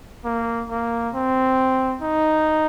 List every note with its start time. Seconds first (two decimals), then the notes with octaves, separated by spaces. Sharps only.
0.25 A#3
0.69 A#3
1.14 C4
2.02 D#4